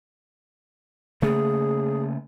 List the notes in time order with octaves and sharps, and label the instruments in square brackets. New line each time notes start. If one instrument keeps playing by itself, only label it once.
[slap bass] C#3 A3 A#3 [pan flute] G#4